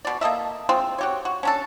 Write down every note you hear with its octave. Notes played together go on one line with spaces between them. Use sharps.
B2 D5
A#3 A4 D#5 E5
G#3 C4 F4
F#4 G4 C#5
F#4
C#4 D4 A4